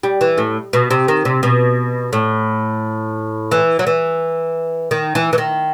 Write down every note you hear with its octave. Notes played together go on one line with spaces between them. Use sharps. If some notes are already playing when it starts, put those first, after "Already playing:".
G3
E3
A2
B2
C3
D#3
C3
B2
A2
E3
F#3
E3
D#3
E3
E3
D#3